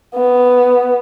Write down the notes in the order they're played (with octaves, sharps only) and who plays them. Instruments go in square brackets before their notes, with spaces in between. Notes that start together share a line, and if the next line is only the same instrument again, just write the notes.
[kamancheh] B3